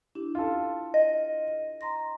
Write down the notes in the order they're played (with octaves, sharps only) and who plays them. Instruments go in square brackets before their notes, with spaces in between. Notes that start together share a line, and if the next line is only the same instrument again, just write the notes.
[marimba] D4 E4 G4
[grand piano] F4 A4
[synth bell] D#5
[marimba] A#5 C6 A#6